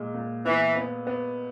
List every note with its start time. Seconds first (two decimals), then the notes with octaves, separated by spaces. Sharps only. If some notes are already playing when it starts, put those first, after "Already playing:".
Already playing: A#2 G#3
0.14 A#2
0.45 E3 B3
0.76 B3
1.07 B3